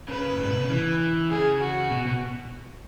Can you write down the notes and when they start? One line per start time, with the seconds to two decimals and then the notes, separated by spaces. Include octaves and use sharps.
0.08 C#3 B4
0.30 F#2
0.40 G#2
0.50 B2
0.60 C#3
0.69 E3
1.30 C#3 G#4
1.61 F#4
1.91 B2
2.06 B2